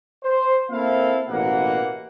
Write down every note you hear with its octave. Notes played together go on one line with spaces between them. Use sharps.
C5
A#3 C4 E4 A4 F5
A1 B2 E3 A#3 F#5